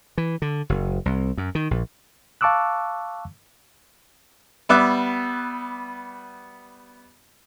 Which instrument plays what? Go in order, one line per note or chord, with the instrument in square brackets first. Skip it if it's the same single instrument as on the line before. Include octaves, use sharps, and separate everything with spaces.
[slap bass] E3
D3
F#1
C2
F#2
D#3
A#1
[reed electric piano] F5 A5 C#6 D6 E6 F#6
[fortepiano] G3 B3 E5 D6 F#6